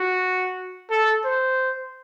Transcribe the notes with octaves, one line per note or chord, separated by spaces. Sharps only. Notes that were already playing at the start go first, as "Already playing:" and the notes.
Already playing: F#4
A4
C5